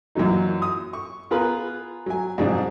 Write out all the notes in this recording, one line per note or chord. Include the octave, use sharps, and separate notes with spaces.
F#2 A#2 E3 F#3 D#4
D#6
C#6
B3 F4 G#4 A#4 B4
F#3 G#5
C2 F2 G#2 F#3 D4 G#4